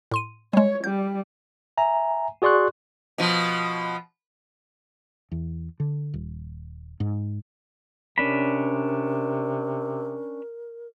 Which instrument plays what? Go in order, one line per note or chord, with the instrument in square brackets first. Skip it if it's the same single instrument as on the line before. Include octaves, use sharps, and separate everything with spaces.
[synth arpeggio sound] A2 C6 D#7
[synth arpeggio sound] G3 G#3 [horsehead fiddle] C#5
[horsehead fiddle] G3 [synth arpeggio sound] G6
[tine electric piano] E5 G#5 A#5
F#4 G#4 D5 C6 C#6 F#6
[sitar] B2 F3
[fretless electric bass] E2
D3
D#1
G#2
[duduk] C3 [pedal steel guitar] C#4 D4 B5 [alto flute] A#4